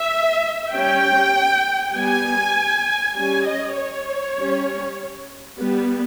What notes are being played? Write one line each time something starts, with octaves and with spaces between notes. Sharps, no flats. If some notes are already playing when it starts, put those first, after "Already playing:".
Already playing: E5
G3 C#4 G5
G3 B3 G#5
G3 C#4 G#5
D#5
C#5
G3 C#4
G3 B3